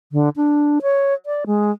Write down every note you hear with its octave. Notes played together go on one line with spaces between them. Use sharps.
D3
D4
C#5
D5
G#3